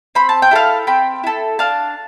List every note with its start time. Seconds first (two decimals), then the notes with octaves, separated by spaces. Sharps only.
0.15 C4 B5
0.29 A5
0.42 G5
0.51 E4 A4 F5 A5
0.87 C4 G5 B5
1.24 E4 A4
1.59 D4 F5 A5